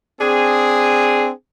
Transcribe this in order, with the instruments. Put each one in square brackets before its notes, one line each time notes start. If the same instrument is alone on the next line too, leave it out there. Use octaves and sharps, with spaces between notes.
[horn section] C4 D4 G#4